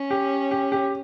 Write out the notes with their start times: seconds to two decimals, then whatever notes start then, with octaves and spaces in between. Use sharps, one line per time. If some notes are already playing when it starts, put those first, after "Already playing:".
Already playing: C#4
0.11 G4
0.51 G4
0.72 G4